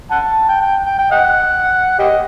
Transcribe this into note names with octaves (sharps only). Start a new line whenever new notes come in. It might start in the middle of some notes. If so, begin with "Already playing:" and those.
F#5 A5
G5
G5
G5
G5
D#5 F#5
G4 D#5